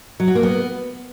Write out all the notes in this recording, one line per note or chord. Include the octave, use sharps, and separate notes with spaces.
F#3
F#4
A#3
B3